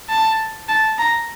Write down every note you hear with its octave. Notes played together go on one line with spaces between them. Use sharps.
A5
A5
A#5